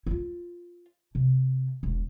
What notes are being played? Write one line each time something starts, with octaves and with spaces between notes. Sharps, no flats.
E4 F4
C3
E1